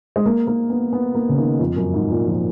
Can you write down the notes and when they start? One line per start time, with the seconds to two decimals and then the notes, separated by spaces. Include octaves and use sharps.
0.16 G#3
0.26 A#3
0.47 A#3
0.70 B3
0.93 B3
1.15 A#3
1.29 C#3
1.38 D#3
1.59 F2
1.76 F#2
1.94 G#2
2.11 A#2
2.27 F3